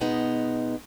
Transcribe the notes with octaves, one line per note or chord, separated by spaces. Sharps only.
B2 G#3 B3 D#4